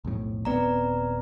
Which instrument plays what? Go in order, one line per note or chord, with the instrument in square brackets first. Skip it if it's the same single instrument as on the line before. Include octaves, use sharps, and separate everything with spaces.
[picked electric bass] B1 F2 A2
[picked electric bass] D#1 B3 C4 [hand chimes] B4 D5 A#5